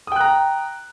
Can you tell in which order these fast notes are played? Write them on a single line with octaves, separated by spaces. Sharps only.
D#6 G5 F#6 A#5